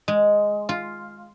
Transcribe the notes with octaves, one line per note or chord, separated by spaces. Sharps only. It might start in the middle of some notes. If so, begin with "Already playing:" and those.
G#3
F4